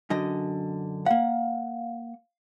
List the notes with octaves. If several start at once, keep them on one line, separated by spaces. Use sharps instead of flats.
F#2 D3 D#5
A#3 F5 F#5